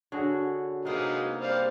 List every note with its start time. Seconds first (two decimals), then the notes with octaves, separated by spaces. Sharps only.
0.12 D3 F#4 G#4 C#5
0.85 C3 G#3 A#3 B3 D#4
1.41 G3 C5 F5